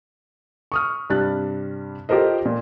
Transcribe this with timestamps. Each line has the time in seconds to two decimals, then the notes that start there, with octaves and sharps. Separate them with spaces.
0.72 C#6 D#6 F6
1.10 G2 C3 G3 F#6 A6
2.09 F4 G4 A4 A#4 C5 D#5
2.45 A#2